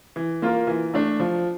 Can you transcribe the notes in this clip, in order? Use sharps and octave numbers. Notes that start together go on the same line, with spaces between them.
E3
A#3 F4 A#4
E3
A3 D4
F3